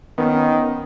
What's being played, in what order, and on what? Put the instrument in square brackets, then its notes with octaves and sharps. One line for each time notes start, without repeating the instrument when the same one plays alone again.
[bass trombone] D#3 [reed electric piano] B3 C#4 B4